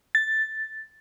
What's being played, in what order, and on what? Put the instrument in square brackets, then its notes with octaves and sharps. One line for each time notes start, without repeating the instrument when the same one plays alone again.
[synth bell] A6